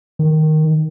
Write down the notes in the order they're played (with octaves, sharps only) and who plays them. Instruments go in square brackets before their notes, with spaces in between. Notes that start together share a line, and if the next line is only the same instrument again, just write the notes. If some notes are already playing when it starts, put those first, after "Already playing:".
[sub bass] D#3